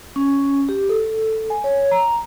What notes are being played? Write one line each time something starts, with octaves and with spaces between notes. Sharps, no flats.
C#4
G4
A4
G#5
C#5
A#5